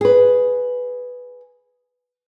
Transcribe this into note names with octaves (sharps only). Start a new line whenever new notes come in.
G#4 B4